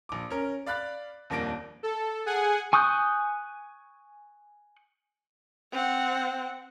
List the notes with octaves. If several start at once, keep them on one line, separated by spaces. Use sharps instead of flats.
A#1 D6
C#4 A#4
D5 F5 B5 F#6 A6
D#1 F2 A#3 D4 A#6 D7
A4
G#4 F#5 G#5
G#5 C#6 D#6 F#6 G6
C4 F#5